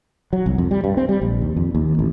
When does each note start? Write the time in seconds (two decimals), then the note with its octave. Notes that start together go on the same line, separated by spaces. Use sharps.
0.33 F#3
0.46 C2
0.58 F2
0.71 G3
0.84 G2
0.97 C4
1.09 G3
1.21 A#1
1.41 D#2
1.56 F2
1.75 D#2
1.99 A1